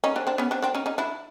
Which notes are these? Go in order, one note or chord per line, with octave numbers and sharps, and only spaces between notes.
C#4 D#4
C4 D4
C4 D4
B3 C#4
C4 D4
C4 D4
C#4 D#4
C#4 D#4
D4 E4